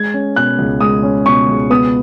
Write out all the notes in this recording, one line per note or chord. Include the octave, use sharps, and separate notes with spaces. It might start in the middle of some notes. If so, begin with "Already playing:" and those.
Already playing: G#3 G#6
C#4
B2 F#6
C#2
G#3 D#6
C#4
B2 C#6
C#2
B3 D#6